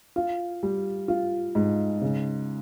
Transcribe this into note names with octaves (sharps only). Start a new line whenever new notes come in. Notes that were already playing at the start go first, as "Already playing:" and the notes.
F4
G3
F4
G#2
C#3